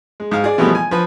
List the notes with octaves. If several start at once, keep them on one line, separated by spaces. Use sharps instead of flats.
G#3
G#2 F5
G#4 D5
B2 E3 F3 G3 A3 B3
G#5
F3 B4